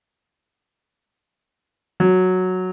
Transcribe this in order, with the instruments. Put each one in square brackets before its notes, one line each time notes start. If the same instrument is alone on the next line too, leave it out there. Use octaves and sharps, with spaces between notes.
[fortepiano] F#3